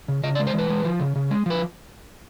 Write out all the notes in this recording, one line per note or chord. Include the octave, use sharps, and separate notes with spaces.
C#3
C#3 D#5
D5
G#3
C5
E3 B4
G#3
F3
C#3
C#3
G#3
F3 B4